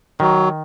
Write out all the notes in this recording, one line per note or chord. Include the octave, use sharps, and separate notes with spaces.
D#3 F#3